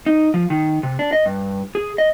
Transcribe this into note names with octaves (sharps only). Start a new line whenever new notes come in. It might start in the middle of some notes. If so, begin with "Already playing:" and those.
D#4
F3
D#3
C3
D4
D#5
G2
G#4
D#5